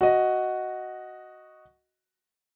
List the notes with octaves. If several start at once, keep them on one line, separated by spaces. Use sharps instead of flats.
F#4 D#5